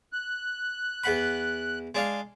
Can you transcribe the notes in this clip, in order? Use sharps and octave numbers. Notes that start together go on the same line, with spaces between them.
F#6
E2 F#5 B5
G#3 D4 F5